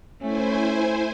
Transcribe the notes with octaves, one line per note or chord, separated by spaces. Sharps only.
A3 C#4 E4 C5 G#5